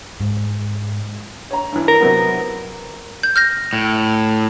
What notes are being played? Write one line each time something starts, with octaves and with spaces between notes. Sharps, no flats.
G#2
C#5 A#5
G2 E3
A#4
C3 F#3 B3
G6
F6 G6 A#6
A2